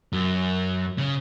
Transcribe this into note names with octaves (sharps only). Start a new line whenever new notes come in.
F#2
C#3